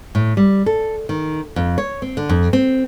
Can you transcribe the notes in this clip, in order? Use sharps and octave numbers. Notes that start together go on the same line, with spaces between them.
A2
G3
A4
D#3
F2
C#5
C4
D3
F2
C4